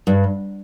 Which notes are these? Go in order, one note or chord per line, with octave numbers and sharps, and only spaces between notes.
G2